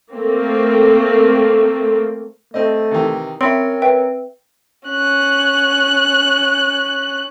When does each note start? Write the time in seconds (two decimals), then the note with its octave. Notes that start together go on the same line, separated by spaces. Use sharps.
0.14 A3 A#3 C4
2.54 A3 C4 D#5
2.91 C3 D#3 E3
3.41 C4 C#4 A#4 E5 B5 C6
3.82 B4 E5 G5
4.88 C#4 F#6